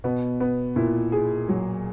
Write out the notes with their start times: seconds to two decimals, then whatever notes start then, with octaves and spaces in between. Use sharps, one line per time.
0.04 B2 B3
0.40 B3
0.76 A#2 E4
1.12 G#4
1.49 F#3